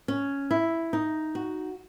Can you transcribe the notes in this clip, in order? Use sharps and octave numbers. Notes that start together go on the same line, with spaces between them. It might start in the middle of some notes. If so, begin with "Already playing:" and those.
C#4
E4
D#4
F#4